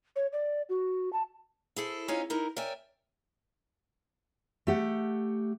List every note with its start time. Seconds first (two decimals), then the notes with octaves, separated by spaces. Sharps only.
0.16 C#5
0.33 D5
0.69 F#4
1.13 A5
1.76 E4 G#4 A4 C5
2.08 C#4 D#4 F4 G#4 C5 C#5
2.30 D#4 E4 A#4
2.56 A#4 C#5 D5 E5 G5 G#5
4.67 A3 G4 F#5